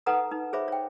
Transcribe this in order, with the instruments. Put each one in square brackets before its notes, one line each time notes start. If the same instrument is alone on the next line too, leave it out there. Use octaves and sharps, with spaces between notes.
[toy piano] D#4 A4 B4 F#5 A#5 D#6
D#4
G#4 C5 C#5 E5 B5 D6
C#5 G5